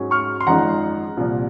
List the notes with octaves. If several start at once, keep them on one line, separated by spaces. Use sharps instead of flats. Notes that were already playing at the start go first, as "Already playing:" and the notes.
Already playing: G#2 F#3 C#4
C#6 F6
C6
G#1 F#2 F3 G#3 D#4 F#5 A#5
C2 A#2 F3